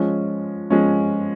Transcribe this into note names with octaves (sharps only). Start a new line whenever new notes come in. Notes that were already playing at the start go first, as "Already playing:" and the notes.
Already playing: F3 G#3 C#4
F3 G#3 C#4